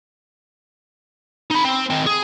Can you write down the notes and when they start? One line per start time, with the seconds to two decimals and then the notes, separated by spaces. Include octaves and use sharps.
1.50 D#4 B5
1.64 C4
1.90 D#3 C4
2.07 G#4